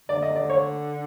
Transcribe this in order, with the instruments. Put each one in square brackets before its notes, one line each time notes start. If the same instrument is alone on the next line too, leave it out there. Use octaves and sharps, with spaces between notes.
[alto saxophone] D3 [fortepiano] D5
[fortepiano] D#5
D5
C#5